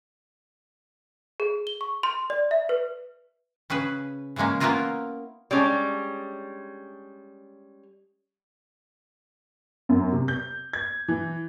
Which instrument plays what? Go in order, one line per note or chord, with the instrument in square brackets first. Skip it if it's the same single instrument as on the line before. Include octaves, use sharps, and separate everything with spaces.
[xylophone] G#4
G7
C#6
C6
D5
E5
B4
[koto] C#3 C#4 G#4 B4
C#3 E3 G#3 A#3 C#4
A#3 B3 C#4 E4 F4 A#4
[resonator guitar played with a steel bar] G3 G#3 C#4 D4
[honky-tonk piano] F#2
C3
G6
G#6
E3